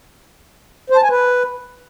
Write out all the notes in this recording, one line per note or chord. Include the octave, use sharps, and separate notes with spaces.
C5
A5
G#5
B4